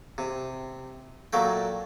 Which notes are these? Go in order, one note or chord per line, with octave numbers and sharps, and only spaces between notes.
C3
A#2 F#3 A3 G5